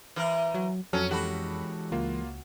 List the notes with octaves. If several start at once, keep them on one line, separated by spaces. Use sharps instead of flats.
E3 A#4
F#3
F2 F#3 C#4 A4 F6
E3 G#3 F#4 G4 A4 B5
C#2 A#3 F4